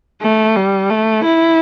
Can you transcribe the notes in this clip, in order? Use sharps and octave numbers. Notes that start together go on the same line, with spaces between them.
A3
G3
A3
E4